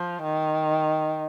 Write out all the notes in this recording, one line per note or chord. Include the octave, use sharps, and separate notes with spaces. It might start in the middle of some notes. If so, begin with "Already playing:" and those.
Already playing: F3
D#3